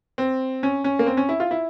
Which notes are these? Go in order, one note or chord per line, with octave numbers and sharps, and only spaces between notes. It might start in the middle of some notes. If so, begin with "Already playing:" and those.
C4
C#4
C#4
A#3
C4
C#4
E4
F4
E4